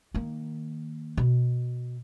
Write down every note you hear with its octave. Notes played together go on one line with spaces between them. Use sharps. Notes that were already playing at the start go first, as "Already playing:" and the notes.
D#3 A#3
B2